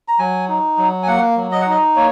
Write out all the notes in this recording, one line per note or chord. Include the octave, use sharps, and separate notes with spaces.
A#5
F#3 G#5
D#4
F#3
G#5
A#3 F#5
F#3
D#5
F#5
D#4 D#5
A#3 C#5